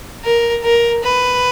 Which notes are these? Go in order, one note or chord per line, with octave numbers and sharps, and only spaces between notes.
A#4
A#4
B4